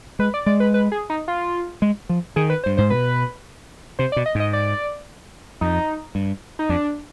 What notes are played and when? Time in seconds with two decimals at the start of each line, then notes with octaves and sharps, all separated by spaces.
0.19 G#3 B4
0.34 D5
0.46 G#3 D5
0.60 B4
0.74 B4
0.92 G#4
1.10 D#4
1.28 F4
1.82 G#3
2.09 F3
2.36 D#3 G#4
2.50 B4
2.64 C5
2.66 G2
2.77 G#2 C5
2.90 B2 B4
3.99 C3 C5
4.12 D5
4.16 B2
4.26 D#5
4.35 G#2
4.40 D#5
4.53 D5
5.61 F2 D#4
6.15 G2
6.59 D#4
6.69 F2 D4